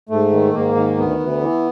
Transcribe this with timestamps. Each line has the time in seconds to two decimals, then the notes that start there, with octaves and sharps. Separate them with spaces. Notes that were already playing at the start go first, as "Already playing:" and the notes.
0.09 G#2 A3
0.32 D#3
0.53 G#2 A#3
0.75 D#3
0.98 D2 B3
1.19 D2
1.41 E3